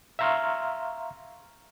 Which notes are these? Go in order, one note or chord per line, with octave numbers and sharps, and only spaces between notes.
E5 F5 A#5 C6 C#6 F6